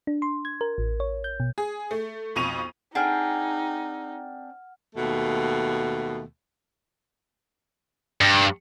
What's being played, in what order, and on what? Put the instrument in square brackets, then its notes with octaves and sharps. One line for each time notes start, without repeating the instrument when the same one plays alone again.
[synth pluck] D4
C6
G#6
A#4
A1
C#5
G6
B2
[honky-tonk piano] G#4
A3
B1 F2 C#6 D#7 F7
[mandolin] C4 D4 G#4 [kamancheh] D#4 [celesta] F#5 F6
[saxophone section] D#2 B2 A3
[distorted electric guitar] G2